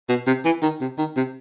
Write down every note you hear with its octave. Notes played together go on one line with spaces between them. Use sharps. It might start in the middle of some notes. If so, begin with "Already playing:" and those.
B2
C3
E3
D#3
C3
D#3
C3